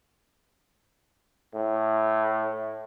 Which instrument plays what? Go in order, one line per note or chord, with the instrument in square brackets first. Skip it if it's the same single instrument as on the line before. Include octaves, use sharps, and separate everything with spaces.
[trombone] A2